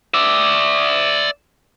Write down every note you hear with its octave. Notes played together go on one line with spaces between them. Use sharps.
D5 E5